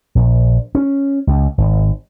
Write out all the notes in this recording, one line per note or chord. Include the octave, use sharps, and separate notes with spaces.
A#1
C#4
C#2
G#1